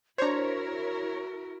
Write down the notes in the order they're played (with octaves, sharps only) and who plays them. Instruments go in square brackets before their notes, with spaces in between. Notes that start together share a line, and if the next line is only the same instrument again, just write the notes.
[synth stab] D4 C5 [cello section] E4 A#4 [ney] F#4 [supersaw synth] C#5 A#5